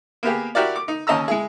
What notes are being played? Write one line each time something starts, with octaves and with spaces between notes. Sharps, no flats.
A#3 B3 G4 G#4
E4 F#4 G4 A#4 D5
D6
D#4
D#2 C#4 D#5 A5 A#5 E6
G#3 E4 G#4